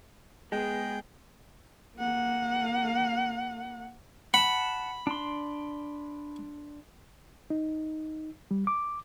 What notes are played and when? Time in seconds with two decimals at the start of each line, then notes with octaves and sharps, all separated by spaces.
0.52 G#3 B3 G#4 G5
1.98 A#3 F#5
4.34 F#5 A5 B5
5.07 D4 C6
7.50 D#4
8.51 G3
8.67 D6